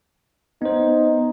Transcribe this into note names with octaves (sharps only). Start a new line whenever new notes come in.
B3 D#4 C5